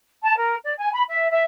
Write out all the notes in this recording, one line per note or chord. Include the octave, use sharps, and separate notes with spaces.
A5
A#4
D5
G#5
B5
E5
E5